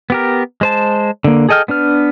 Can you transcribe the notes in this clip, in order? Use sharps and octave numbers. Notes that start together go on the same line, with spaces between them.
B3 G4 A#4
G#3 C5 A5
D3 A#3
G#4 A4 D#5 G5 F6
B3 D4 B4 F6